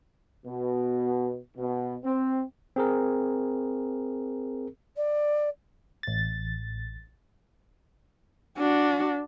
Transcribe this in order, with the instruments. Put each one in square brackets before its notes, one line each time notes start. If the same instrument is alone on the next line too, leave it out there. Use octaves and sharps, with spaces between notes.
[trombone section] B2
B2
C4
[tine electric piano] C4 G#4 A#4
[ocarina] D5
[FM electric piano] A1 A6
[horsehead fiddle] D4 F#4